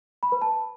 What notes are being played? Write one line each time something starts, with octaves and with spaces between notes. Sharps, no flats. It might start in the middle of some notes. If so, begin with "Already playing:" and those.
B5
B4
A5